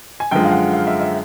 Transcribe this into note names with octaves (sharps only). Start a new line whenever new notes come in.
G#5
F#2 D3 F3 G#3 G5
F5
F#5
F5
E5
E5